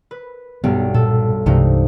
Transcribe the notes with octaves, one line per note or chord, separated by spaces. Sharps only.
B4
B1 G2 G3 B3
A#2 A4
C2 G2 C3 E3 G#3 D#4